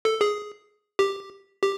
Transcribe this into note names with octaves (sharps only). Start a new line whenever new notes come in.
A4
G#4
G4
G4